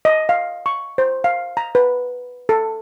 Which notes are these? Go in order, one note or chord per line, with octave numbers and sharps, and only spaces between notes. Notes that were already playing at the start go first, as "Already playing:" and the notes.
D#5
F5
C#6
C5
F5
A#5
B4
A4